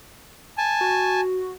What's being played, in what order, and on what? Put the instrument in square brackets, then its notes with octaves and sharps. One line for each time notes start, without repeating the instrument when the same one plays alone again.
[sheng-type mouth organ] G#5 A5
[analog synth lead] F#4